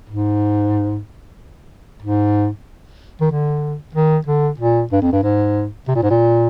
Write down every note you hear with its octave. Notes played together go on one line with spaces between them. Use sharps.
G#2
G#2
D#3
D3
D#3
D3
A#2
G2
F2
G2
G#2
C3
A#2
G#2
A#2